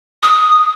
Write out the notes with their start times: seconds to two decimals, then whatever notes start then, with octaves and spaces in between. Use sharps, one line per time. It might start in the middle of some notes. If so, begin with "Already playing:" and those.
0.23 D#6